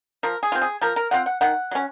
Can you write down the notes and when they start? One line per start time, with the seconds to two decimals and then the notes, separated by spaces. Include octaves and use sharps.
0.23 F3 A#4
0.43 G#4
0.52 C4 F4
0.62 G#4
0.81 F3 A#4
0.96 A#4
1.11 C4 F4 F#5
1.26 F#5
1.41 D#3 F#5
1.71 F#3 C#4